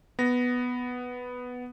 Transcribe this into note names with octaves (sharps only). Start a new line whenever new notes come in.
B3 A#6